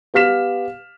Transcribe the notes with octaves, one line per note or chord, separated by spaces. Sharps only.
B3 G4 F5 F6 B6 E7